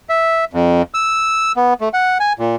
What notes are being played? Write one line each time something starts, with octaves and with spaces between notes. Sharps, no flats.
E5
F2
E6
B3
A3
F#5
G#5
A#2